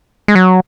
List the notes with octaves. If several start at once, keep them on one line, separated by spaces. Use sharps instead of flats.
G#3
F#3